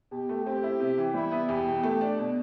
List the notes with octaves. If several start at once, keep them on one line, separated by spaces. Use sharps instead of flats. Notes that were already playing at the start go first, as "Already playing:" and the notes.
B2 G4
A3
C4 G4
E4
C3
E3
G3 E4
B3
E2 G4
B2
A3
D4
B2